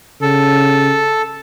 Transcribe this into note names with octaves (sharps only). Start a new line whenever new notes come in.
C#3 A4